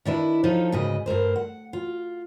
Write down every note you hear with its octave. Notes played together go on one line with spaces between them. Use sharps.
D#3 D4 E4 B4
F3 D#4 F4 A4 C#5
D2 G#2 C#3 B4 D#5
G2 A3 A#4 C5
F#5
F4